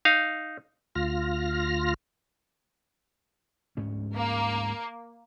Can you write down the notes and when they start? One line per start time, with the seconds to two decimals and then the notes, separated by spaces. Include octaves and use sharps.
0.05 D#4 F5
0.95 D2 F4 F6 A#6
3.77 D2 G#2 C#4
4.16 A#3